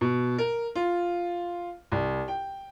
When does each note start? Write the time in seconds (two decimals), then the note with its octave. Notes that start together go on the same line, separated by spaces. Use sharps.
0.01 B2
0.38 A#4
0.75 F4
1.92 C2
2.28 G5